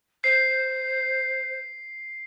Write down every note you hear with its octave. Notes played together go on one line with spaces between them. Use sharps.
C5 C7